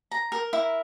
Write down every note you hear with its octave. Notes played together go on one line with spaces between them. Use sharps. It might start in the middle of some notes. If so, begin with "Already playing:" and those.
A#5
A#4
E4